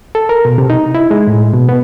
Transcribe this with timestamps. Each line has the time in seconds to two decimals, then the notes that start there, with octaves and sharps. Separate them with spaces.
0.15 A4
0.29 A#4
0.45 B2
0.58 C3
0.70 D#4
0.95 E4
1.11 G#3
1.27 A2
1.54 B2
1.69 B3